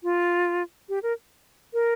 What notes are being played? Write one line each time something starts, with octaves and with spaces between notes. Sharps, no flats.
F4
G4
A#4
A#4